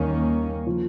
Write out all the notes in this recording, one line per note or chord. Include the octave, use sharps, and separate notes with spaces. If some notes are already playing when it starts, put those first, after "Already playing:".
Already playing: D#2 D#3 G3 A#3 C#4
F3